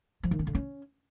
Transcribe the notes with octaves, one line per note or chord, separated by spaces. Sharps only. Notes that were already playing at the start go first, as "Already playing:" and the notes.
F3
D#3
C#4
D3
C#4